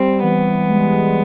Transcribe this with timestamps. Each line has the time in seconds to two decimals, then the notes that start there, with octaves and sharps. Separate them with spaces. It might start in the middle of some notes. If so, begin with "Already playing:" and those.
Already playing: G3 C4
0.23 E3 B3
0.69 G#3